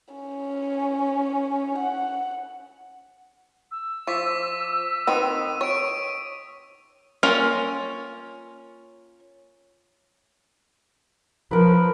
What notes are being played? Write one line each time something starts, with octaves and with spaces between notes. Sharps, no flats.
C#4
F#5
E6
F3 C#6 D6 B6
D#3 C4 B4 D#6 D#7
C#5 C#6 D7
A#3 C#4 F4 A#4
F3 A#4 B4